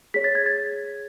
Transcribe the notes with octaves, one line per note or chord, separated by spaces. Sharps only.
G#4 C#5 B6
A6
G#6
A6